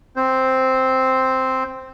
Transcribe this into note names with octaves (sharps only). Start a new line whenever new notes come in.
C4 C5